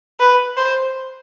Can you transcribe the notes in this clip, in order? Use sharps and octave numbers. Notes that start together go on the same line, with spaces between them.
B4
C5